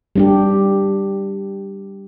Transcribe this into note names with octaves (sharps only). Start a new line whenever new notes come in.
G3 D4 G4